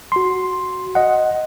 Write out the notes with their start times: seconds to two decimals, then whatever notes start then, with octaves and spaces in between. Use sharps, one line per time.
0.12 F#4 C6
0.95 D#5 F#5